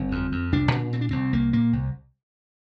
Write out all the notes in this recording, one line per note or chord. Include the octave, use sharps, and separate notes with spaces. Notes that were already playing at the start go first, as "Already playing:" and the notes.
Already playing: G1 C4
F2
F2
C2 D4
A#2
A#2 C4
D4
C2 C4
C2 A#3
A#2 A#3
C2